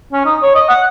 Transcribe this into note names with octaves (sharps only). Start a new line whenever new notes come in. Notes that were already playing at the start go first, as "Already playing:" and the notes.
C#4
D#4
C#5
D#5
F#5